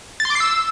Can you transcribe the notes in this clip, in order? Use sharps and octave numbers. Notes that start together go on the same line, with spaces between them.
A6
C6
D6
C7
E6